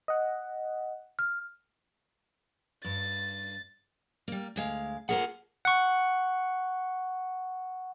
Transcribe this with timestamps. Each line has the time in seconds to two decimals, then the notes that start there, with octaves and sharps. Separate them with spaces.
0.08 D#5 F#5
1.19 F6
2.84 G2 A6
4.28 G3 A#3
4.56 D2 G#3 F5
5.09 A#2 G#4 A#4 C5 F#5
5.65 F#5 C#6